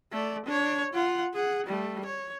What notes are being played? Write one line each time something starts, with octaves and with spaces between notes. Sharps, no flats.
A3 D5
D4 C#5
F4 F#5
G#4 F#5
G3 A3
C#5